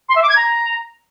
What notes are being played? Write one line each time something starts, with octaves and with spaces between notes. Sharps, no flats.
C6
E5
D6
G#6
A#5